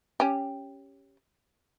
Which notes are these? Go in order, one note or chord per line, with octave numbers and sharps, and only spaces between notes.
C#4 G4